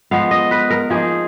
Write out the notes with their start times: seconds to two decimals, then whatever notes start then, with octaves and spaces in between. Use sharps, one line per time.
0.11 F3 G#3 B3 F5
0.31 D#5
0.51 B4
0.70 A#4
0.90 F3 A#3 D#4 G#4